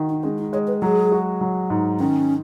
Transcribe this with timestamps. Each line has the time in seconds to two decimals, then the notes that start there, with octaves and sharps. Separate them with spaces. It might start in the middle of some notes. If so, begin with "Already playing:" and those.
Already playing: D#3 F#4
0.09 D#4
0.23 G#3 C#4
0.38 D#4
0.53 G#3 C#5
0.67 B4
0.82 F#3 G#4
1.12 F#4
1.41 F#3
1.70 G#2
1.99 D#3 C#4